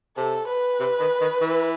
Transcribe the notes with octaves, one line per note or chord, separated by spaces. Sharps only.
C3 A4
B4
C3
D#3
D#3
E3